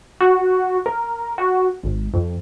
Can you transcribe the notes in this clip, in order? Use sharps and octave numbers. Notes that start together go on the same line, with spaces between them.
F#4
A#4
F#4
G#1
F2